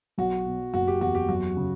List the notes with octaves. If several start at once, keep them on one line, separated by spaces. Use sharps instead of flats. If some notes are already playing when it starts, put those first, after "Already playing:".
B1 F#4
B2
F#1 F#4
G4
E2 F#4
G4
F#2 F#4
C#3